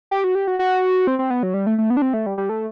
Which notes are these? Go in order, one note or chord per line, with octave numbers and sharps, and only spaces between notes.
G4
F#4
G4
F#4
F#4
C4
C4
B3
F#3
G3
A3
A3
B3
D4
C4
A3
G3
G3
A3